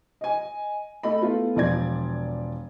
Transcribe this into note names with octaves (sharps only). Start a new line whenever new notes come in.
D#5 G#5
A3 A4 D#5 B5
A3 B3 E4 F4
E1 F3 D5 G#6